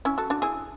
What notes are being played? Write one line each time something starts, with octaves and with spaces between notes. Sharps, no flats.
C#4 E4
F#4 A4
D4 F#4
E4 G#4